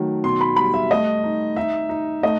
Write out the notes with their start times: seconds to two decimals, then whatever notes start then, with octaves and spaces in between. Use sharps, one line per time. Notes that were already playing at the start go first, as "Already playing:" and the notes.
Already playing: D#3 F#3 A3
0.24 B2 C6
0.41 B5
0.56 G3 B5
0.74 E5
0.91 A3 D#5
1.24 D#4
1.56 D#4 E5
1.89 D#4
2.23 A3 D#5